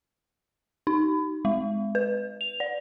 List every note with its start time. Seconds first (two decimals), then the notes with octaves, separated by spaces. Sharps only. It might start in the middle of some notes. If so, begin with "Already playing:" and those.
0.87 D#4
1.45 G#3
1.95 B4
2.41 F7
2.60 D5